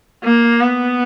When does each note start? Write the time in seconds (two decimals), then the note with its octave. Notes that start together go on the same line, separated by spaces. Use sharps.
0.24 A#3
0.60 B3